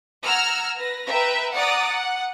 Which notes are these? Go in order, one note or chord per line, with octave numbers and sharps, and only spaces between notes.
F#5 A#5 E6 F6 G#6
B4 A#6
B4 E5 G5 A#5
D5 F#5 A#5 D#6 A6
F#5